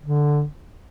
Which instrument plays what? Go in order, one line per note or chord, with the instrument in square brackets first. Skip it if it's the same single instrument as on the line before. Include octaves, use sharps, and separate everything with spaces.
[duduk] D3